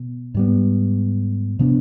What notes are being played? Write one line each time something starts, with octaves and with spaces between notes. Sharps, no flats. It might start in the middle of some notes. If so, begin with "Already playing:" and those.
Already playing: B2
G#2 G3 B3
C3 F3 B3 D4